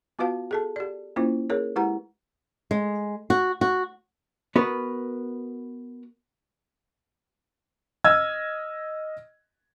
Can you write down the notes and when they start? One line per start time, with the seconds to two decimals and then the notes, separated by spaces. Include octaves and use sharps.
0.19 B3 F4 F#4 B4 F5 A5
0.51 G#4 A4 A5
0.76 G4 D5
1.16 A#3 C#4 E4 F4 C5
1.50 G#4 A#4 C#5
1.76 G#3 E4 G4 B4 F#5 A#5
2.71 G#3
3.30 F#4
3.61 F#4
4.56 B3 F#4 A#4 B4
8.05 D#5 E6 F6 G#6